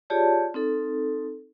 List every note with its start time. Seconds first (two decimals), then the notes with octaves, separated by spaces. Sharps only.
0.10 F4 G4 G#4 C#5 D5 A5
0.54 C4 D#4 A4